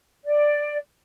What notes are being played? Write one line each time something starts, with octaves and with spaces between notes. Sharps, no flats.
D5